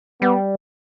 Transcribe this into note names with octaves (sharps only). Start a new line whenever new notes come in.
G3 B3